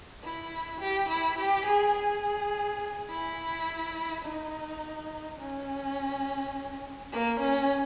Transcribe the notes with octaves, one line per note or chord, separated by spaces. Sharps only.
E4
G4
E4
G4
G#4
G#4
E4
D#4
C#4
A#3
C#4